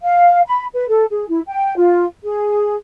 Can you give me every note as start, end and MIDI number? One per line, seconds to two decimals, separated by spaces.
0.03 0.40 77
0.46 0.66 83
0.74 0.85 71
0.89 1.04 69
1.11 1.26 68
1.29 1.41 64
1.48 1.75 79
1.76 2.05 65
2.24 2.75 68